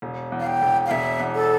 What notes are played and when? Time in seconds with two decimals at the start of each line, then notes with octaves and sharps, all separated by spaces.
0.02 E1
0.32 E2
0.40 F5
0.47 G5
0.62 E1
0.86 F5
0.91 E1 E5
1.20 E2
1.35 A4